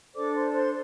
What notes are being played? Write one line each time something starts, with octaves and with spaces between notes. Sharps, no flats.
D4 A4 C5 D5 D6
C5 C6
C5 C6